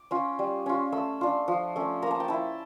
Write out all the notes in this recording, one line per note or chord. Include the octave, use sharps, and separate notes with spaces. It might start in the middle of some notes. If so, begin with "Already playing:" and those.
Already playing: D6
C#4 F4
G3
C#4 F4
A3 E6
D4 F4
F3
A3 C#4
A#3 A#5
A5
G5
E4 A5